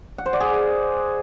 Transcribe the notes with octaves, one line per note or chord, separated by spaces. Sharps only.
F#5
C5
D5
G#4